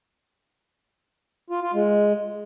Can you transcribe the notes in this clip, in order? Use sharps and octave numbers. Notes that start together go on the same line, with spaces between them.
F4
F4
G#3